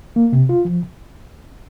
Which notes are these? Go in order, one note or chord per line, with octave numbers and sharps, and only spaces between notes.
A#3
C3
F4
F3